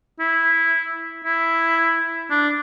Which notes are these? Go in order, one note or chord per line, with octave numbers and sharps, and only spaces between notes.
E4
E4
D4